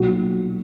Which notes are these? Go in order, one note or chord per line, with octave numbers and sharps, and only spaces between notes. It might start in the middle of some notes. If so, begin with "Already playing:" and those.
Already playing: B1 A#2 F#3 F#4